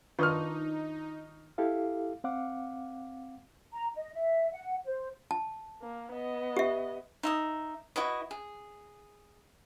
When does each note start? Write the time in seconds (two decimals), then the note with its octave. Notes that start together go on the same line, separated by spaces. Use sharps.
0.19 D#3 D4 D#4 F4 B4 C#6 D#6 F6
1.58 E4 G4 A4 F5
2.24 C4 F5 F#5 D6
3.73 A#5
3.96 D#5
4.14 E5
4.52 F#5
4.85 C5
5.31 A5
5.82 A#3
6.11 B3 D#5
6.57 G4 E5
7.23 D#4 E5 D#6
7.96 E4 F#4 B4 D#5
8.31 G#4